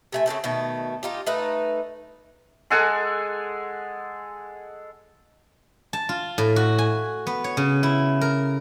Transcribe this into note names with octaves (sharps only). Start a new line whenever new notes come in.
C3 A3 G#5
C#3 A3 C4 A4
B2 D#3 A3
D#4 F4 G4
A3 D#4 B4
G#3 A4 F#5 G#5
A5
F4
A2
F#4
G#5
B3
C#5
C#3
E4
A#4